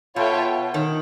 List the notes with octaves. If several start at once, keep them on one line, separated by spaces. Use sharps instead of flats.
B2 F4 A4 C#5 E5 G5
D#3